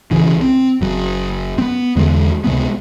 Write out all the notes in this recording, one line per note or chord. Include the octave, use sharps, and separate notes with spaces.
B1 C#3 E3
C4
F#1 F#3
B3 C4
E2 D3 G#3
C#2 C3 G#3 B3